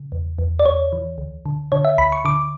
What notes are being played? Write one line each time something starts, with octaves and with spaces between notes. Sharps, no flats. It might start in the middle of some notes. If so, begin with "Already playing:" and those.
Already playing: C#3
E2
E2
D5
E2 C#5
E3
D2
D3
D3 C#5
E5
D2 B5
C#6
D3 D6